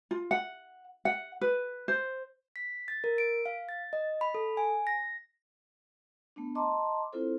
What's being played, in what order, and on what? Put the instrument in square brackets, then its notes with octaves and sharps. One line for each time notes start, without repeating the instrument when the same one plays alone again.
[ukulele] F4
F#5
F#5
B4
C5
[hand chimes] B6
A6
A#4
D7
F5
A6
D#5
B5
A4
G#5
A#6
[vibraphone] A3 B3 D4
D#5 A5 A#5 C6 D6
C4 E4 F4 A4 C5